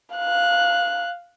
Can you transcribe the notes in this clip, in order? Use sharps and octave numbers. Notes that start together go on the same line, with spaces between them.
F5 F#6